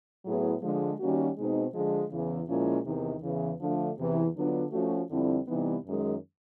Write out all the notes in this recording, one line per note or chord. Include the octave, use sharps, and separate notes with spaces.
A2 F#3 B3 E4 G#4
D3 F3 G#3
D#3 G3 A#3 C#4 F#4
B2 G#3 C4 D#4
D3 F3 G#3
E2 C#3 E3
A#2 F3 G#3 C#4 E4
E2 C3 D#3
E2 C#3 E3
D3 F3 A3 D4 F4
E2 C3 E3
D3 F#3 B3 D4 F4
F3 A3 C#4 F#4
F2 D3 G3 C4 E4
C3 E3 G3 B3 D#4
F#2 D#3 G#3